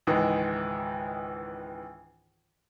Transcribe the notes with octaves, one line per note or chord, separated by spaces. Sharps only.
C#2 G#2 D#3 E3 D#4